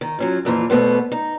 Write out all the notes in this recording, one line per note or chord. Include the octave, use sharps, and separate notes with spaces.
D#3
F#3 C#4 F4
F2 A#2 E3 F4
E2 B2 A3 B3 C5
D#4